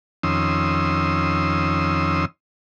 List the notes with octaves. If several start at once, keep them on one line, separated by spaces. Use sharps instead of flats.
F2 D#3 C#4 C6 D#6 E6